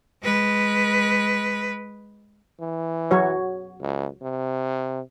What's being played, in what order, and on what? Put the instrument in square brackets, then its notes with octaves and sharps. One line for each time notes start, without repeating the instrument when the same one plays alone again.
[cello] G#3 B4
[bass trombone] E3
[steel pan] F#3 F#4 C#5
[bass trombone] C#2
C3